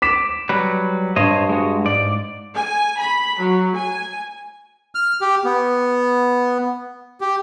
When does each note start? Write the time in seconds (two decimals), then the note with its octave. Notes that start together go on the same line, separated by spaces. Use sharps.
0.02 D6 B6 E7
0.49 F#3 G3 B4
1.16 G2 C5 C#5 D#5
1.49 G#3 F#4
1.85 G#2 D5
2.55 G#5
2.98 B5
3.41 F#3
3.73 G#5
4.95 F6
5.21 G4
5.45 B3
7.21 G4